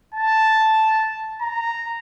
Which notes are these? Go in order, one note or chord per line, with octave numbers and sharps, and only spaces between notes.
A5
A#5